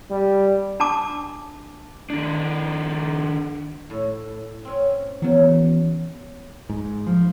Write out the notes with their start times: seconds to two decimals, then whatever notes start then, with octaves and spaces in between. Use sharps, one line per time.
0.10 G3
0.80 D4 A5 D6
2.10 D#3 D4
3.90 A2
4.65 C4 C#4
5.22 C#3 E3 F#3 B3
6.69 G#2
7.07 F3